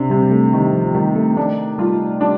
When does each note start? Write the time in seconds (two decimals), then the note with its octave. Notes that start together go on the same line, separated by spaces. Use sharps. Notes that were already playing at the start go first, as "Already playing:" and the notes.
Already playing: C3 C4 D4
0.10 C3 G3
0.22 G3
0.31 A3
0.53 D#3 G3
0.73 F3
0.85 F3
0.95 D#3 G3
1.15 A3
1.37 A3 D4
1.79 G3 F4
2.21 G3 D4